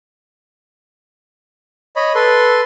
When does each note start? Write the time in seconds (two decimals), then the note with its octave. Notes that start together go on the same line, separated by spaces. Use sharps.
1.96 C#5 D#5 B5
2.15 A4 B4 C6